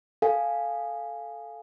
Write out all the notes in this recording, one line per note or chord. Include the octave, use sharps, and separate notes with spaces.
A4 F5 G#5